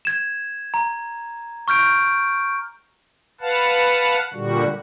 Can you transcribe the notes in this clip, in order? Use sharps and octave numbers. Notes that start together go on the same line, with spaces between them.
G#6 E7
A#5
C#6 F6 G6 D7
B4 F5 F#5 A5
A#2 D3 G3 F#4